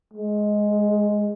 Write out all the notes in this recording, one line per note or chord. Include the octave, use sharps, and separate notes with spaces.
G#3